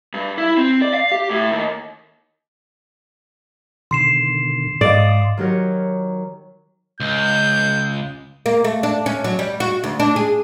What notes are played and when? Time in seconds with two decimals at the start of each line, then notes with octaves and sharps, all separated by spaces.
0.14 G2
0.38 E4
0.58 C4
0.82 D5
0.94 F5
1.12 G4
1.31 A2
1.51 D#2
3.91 B2 D3 D#3 C6 C7 E7
4.81 G#2 D5 D#5 F5 D#6
5.37 D#3 F#3 G4 A#4 C#5
7.00 C#2 G6
8.46 A#3
8.64 A3
8.83 D4
9.06 C#4
9.24 F#3
9.39 G3
9.60 F#4
9.84 D2
10.00 D4
10.16 G#4